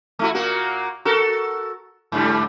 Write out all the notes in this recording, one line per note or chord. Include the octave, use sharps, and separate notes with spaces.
A3 E4 F#4
A#2 A#3 F#4
F#4 A4 A#4
G#2 D3 G3